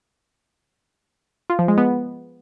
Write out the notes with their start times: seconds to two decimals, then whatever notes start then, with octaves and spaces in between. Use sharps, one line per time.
1.50 F4
1.59 F3
1.68 G#3
1.77 B3